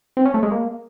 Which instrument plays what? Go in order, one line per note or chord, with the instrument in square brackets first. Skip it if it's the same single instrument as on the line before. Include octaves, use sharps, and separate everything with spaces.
[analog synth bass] C4
C#4
A3
G#3
A#3